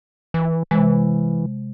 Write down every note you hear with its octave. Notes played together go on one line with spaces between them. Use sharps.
E3
C3 E3 G#3